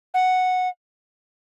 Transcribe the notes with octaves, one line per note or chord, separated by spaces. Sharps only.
F#5